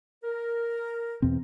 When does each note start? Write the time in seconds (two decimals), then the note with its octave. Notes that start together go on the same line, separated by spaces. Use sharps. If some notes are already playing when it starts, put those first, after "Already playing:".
0.24 A#4
1.22 E2 B2 C4